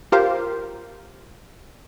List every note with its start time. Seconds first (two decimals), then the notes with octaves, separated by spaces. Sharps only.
0.12 F4 G4 A#4 C5 F5